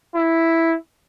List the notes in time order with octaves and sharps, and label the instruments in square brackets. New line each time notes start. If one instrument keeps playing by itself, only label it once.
[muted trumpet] E4